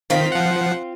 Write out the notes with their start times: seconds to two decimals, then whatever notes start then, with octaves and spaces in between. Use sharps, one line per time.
0.10 D#3 C4 F4 B6
0.32 F3 F#5